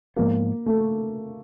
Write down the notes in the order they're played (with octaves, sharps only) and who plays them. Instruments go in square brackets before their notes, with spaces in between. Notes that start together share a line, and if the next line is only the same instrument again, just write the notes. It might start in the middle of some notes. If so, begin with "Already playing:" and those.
[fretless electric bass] G#2 F3 G#3 B3 [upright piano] A#3
[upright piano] A3